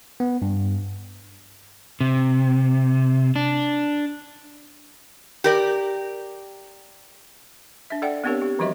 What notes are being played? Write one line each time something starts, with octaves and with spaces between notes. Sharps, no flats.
B3
G2
C3
D4
G4 A#4 D5
D4 E5
A4 D5 F#5 G5
B3 C4 D4 G4 A#4 C#5
G4
E3 F3 G3 F#4 D#5 E5